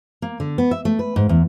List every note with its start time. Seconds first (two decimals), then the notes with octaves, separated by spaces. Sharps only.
0.22 A#3
0.40 D3
0.58 B3
0.71 E5
0.85 A3
0.99 B4
1.16 G#2
1.29 E2